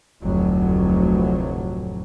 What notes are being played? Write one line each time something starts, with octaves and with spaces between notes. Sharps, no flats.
F1 D2 A2 F#3